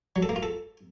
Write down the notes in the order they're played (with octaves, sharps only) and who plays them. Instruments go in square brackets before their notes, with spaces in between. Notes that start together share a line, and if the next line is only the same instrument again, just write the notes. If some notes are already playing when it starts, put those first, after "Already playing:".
[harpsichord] F#3
A4
A#3
F4
A4